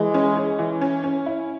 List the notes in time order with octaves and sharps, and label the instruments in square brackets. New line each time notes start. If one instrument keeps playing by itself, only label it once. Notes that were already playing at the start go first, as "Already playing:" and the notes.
Already playing: [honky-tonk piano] E3 [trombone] G#3
[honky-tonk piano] C#4
C#4
E3
C#4
C#4
E4